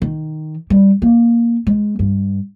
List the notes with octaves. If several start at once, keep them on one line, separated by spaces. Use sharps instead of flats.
D#3
G3
A#3
G#3
G2